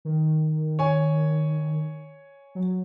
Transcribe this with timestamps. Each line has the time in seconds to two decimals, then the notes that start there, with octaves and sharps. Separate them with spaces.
0.05 D#3
0.79 C#5 G#5
2.55 F#3